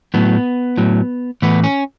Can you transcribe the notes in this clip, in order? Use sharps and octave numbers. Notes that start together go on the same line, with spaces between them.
A2 F#3 B3
A2 F#3
A2 E3 B3
C#4